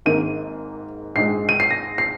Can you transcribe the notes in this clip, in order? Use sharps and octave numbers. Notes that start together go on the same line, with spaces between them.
G#1 G#2 D#3 A#3 D#7
A#1 G#2 G#3 C7
D#7
C7
A#6
C7